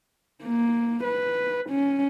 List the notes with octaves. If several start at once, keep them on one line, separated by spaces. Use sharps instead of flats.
A#3
B4
C#4